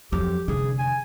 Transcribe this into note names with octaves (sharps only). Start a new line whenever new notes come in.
F2 F#3 G4
F1 D3 G#4
G#5